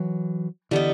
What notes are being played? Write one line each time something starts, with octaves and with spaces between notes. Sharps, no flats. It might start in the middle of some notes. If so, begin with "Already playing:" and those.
Already playing: E3 F#3
D3 E3 G3 B3 D#4